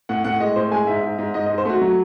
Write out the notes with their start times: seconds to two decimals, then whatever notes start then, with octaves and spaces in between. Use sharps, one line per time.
0.09 A2 F#5
0.24 A2 F#5
0.40 G#3 D#5
0.56 A2 C5
0.72 G#3 G#5
0.87 G#2 E5
1.03 G#2
1.19 G#2
1.34 G#2 D#5
1.46 G#2 D#5
1.58 C5
1.65 A3 F#4
1.82 F#3